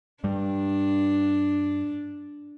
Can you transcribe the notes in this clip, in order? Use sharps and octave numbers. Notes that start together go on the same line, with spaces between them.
G2 G3 D4